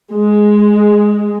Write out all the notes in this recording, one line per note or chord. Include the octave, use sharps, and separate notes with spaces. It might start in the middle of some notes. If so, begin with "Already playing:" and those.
G#3